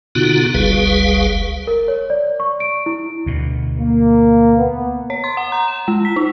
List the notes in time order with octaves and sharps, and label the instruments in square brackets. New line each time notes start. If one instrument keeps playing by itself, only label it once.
[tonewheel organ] B2 D3 B3 D#4 F4 F#4
F#1 C#2 G3 G#4 B4 F5
[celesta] A#4
C#5
D5
C#6
D7
E4
[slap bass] D2 B2
[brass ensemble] A#3
B3
[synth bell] C#5
C6
F#5
A#5
E7
G#3
B6
D#4